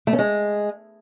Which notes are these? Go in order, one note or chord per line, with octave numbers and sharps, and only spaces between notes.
A3
C#4
G#3